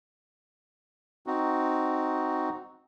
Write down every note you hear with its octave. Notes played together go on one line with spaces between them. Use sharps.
C4 D#4 F#4